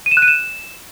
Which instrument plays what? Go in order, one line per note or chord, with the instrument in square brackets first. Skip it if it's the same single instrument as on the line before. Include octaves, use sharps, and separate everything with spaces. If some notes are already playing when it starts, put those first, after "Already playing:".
[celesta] D#7
E7
F#6
D#7
E7